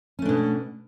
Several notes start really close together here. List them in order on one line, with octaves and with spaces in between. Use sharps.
C#4 A3 D4 B2